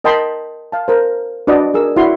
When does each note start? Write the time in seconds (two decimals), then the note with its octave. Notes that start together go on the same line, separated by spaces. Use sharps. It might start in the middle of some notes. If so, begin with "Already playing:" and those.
0.04 A#4 D#5 G5 A5 B5 C6
0.72 F5 A5
0.88 A#4 C5
1.47 D4 F#4 B4 D5 D#5
1.74 G#4 A#4 E6
1.96 E4 F#4 D5 C6